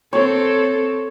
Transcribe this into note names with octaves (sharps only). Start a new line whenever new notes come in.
C4 A4 C#5